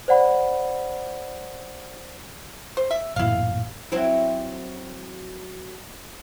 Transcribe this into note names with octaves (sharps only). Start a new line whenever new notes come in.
C5 D5 F#5 B5
C5
E5
A1 F#2 A#2 E4 F5
F#3 C4 E4